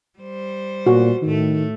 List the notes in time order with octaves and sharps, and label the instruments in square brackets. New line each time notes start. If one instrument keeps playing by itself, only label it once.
[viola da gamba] G3 C5
[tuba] A#2 [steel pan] F#4
[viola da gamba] A2 A3 [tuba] D#3